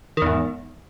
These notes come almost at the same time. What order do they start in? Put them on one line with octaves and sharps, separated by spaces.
D#3 E2 G#2